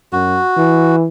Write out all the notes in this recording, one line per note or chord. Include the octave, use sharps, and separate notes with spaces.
F#2 F#4
E3